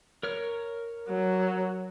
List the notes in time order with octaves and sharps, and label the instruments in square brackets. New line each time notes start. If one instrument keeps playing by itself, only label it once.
[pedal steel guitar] A#4 C#5 F6
[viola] F#3